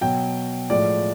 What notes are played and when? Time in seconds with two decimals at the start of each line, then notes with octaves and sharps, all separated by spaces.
0.01 B2 F#3 G5
0.70 A2 F3 G#3 D5